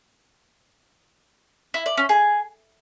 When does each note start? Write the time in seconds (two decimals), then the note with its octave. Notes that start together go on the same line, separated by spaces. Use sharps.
1.74 E4
1.86 D5
1.97 C#4
2.09 G#4